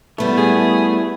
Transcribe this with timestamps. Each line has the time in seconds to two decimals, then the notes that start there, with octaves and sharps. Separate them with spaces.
0.18 G3 A3 B3 E4
0.37 G#4